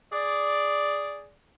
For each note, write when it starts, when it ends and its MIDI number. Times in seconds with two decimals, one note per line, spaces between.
0.12 1.31 68
0.12 1.31 74